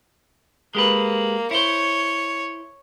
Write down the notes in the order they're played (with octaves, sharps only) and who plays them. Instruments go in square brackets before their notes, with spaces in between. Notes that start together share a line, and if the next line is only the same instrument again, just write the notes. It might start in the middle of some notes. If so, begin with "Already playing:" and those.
[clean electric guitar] G#3 G4 B4 [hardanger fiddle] A#3
[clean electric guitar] E4 C5 [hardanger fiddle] C#5